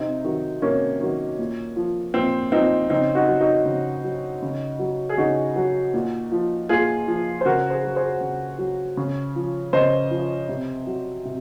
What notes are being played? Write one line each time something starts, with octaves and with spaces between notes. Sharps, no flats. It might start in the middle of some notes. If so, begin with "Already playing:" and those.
Already playing: C3 C4 D#4
D#3 F#3
C3 A#3 C#4
D#3 F#3
A#2
F3
A#2 C4
F3 C4 D#4
C#3 C4 D#4
D#4 F#4
F#3
D#4 F#4
C#3
F#3
C#3
F#3
G#4
C#3 D#4 F#4
F#3
A#2
F3
A#2 F4 G#4
F3
C5
C#3 F#4 A#4
G#4 C5
F#3
G#4 C5
C#3
F#3
C#3
F3
C#3 C5 D#5
F3
C3
F#3
C3